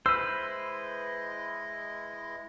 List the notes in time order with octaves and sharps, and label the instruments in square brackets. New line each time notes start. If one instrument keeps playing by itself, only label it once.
[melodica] G#3 E4 D#5 [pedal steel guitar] B4 C5 [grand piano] E6